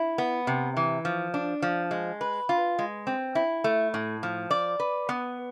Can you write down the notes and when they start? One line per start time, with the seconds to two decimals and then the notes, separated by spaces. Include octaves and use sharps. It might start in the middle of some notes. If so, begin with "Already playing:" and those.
Already playing: E4
0.18 B3
0.47 C3
0.77 E3
1.05 F3
1.34 D4
1.62 F3
1.91 G#3
2.21 B4
2.49 F4
2.79 G#3
3.07 C4
3.35 E4
3.64 A3
3.94 A2
4.23 F3
4.51 D5
4.80 B4
5.09 B3